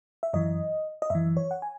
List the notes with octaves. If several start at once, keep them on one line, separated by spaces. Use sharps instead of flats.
E5
F#2 E3 D#5
D#5
F#2 E3 E5
C#5
F#5
G#5